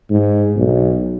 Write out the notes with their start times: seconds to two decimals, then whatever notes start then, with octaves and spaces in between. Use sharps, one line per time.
0.10 G#2
0.56 B1